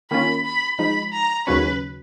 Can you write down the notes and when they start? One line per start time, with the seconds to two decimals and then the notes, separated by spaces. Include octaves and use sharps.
0.11 D#3 A#3 C#4 F4 B5
0.45 B5
0.79 F3 G#3 D#4 B5
1.13 A#5
1.47 D#2 C#3 F#3 C#4 B4